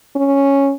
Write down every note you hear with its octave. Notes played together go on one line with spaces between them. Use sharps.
C#4